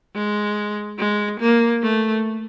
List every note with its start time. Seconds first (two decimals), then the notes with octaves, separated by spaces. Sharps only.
0.15 G#3
0.99 G#3
1.40 A#3
1.83 A3